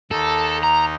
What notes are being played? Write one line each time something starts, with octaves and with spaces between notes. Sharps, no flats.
D#2 D#4 A4
A#5